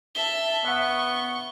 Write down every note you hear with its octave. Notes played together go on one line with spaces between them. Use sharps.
E5 A5 G7
B3 E5 F#5 C#6